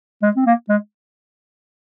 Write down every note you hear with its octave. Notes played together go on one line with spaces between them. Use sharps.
G#3
C4
A#3
G#3